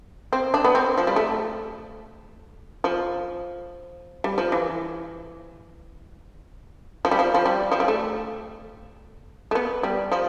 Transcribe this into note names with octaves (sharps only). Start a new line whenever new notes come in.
C4
D4
B3
C4
F3
G3
A3
F3
G3
F3
E3
F3
G3
F3
F3
G3
F3
G3
A3
A3
B3
G3
F3